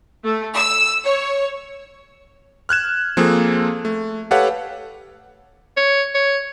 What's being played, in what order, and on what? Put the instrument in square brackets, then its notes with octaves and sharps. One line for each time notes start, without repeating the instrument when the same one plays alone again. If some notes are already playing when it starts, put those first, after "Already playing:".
[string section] A3
E6
C#5
[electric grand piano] F6 F#6 G#6 E7
F3 A#3 C4 G#4 A4
A3
G4 A4 B4 C#5 F5 F#5
[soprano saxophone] C#5
C#5